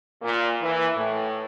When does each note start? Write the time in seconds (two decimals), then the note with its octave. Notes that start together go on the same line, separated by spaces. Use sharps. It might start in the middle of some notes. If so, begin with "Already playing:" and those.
0.22 A#2
0.61 E3
0.96 A2